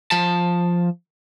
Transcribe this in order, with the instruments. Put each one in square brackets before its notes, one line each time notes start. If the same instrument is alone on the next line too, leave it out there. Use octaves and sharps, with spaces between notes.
[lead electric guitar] F3 A5